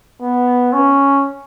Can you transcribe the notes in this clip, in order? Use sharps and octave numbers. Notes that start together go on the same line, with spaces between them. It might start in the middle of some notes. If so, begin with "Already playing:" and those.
B3
C#4